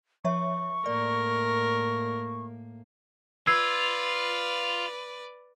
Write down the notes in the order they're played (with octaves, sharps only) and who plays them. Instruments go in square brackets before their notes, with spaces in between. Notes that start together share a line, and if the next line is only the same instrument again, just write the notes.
[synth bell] F3 C#5 E5 [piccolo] C#6
[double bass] A2 A#3 [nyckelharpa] A#4 [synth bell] D5
[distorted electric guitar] F4 [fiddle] B4 D5 [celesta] E6 G#6 C7